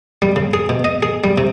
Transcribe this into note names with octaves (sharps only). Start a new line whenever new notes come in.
G3
C#3
G#4
B2
D#5
G#4
G3
C3